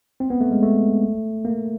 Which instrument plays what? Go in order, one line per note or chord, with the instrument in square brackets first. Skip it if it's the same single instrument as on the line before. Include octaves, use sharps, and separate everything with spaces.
[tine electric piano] C4
B3
A3
G#3
A3
A#3